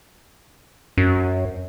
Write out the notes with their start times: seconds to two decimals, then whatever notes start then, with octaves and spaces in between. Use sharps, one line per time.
0.98 F#2